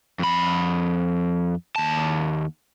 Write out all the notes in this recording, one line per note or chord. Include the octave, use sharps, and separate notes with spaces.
F2 B5
D#2 A5